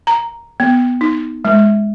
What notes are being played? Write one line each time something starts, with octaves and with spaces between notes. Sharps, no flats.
A#5
B3
D#4
G#3